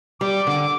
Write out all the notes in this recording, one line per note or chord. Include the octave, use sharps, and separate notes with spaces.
G3 D6
D3 D6